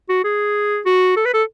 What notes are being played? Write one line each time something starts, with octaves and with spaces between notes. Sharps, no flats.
F#4
G#4
F#4
A4
B4
A4